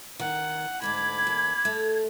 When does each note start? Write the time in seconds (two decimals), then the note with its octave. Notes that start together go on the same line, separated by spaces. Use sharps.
0.20 D#3 F#5
0.82 D2 G#2 D4 B5 D6 G#6
1.27 D#2
1.65 A3